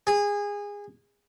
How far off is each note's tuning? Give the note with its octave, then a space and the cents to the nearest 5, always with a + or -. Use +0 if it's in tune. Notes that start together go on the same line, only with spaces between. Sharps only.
G#4 -25